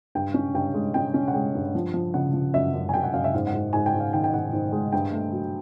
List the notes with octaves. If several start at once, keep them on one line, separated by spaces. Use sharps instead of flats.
G2 G5
C#4
G2 G5
G#3
C#4 G5
C#4
F#5
G#3 G5
G2
F3
F3
C#3 F#5
F3
F#2 E5
F#2
G#5
F#2 G5
F#5
F#2 F5
E5
G#2 F5
F#5
G#2
G#2 G#5
G5
G#2
F5
D#3 G5
G5
G#2 F#5
G#2
G#3
G2 G5
A3
F#3